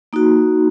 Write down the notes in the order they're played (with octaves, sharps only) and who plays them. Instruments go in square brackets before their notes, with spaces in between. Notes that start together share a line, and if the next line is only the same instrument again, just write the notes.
[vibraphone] A#3 D#4 F#4